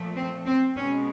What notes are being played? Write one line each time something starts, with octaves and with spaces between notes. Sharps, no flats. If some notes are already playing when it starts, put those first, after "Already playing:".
Already playing: A#2 F3 A3
C4
C4
B2 G#3 C#4